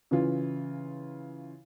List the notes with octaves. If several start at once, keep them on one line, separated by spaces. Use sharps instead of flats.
C#3 E3 F4